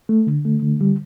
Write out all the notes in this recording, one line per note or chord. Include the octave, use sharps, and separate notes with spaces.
A3
D3
A3
D3
G3